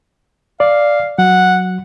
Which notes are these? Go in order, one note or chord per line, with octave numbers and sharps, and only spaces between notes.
D5 F5
F#3 F#5